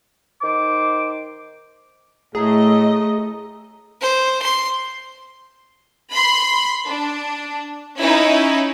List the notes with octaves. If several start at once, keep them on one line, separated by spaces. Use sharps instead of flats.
D#3 C5 D6
A2 A3 G#4 D#5 A5 A#5
C5
C6
B5 C6
D4
C#4 D#4 E4